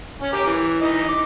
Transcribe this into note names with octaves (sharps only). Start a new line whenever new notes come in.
C#4
G4 A#4 D6
E3
E3 D#4 D#5
D6